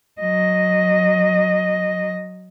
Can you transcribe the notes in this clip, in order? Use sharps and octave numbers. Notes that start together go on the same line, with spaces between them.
F#3 D#5